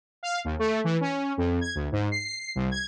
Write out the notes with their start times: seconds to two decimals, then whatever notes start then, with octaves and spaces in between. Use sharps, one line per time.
0.23 F5
0.45 D#2
0.59 A3
0.84 E3
1.01 C#4
1.37 F2
1.61 G#6
1.75 D2
1.92 G#2
2.12 C7
2.55 C2
2.71 G#6